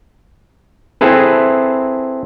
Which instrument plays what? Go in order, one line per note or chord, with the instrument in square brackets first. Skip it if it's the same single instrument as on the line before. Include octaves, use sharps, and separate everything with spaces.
[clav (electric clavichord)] C4 E4 G#4 A4 B4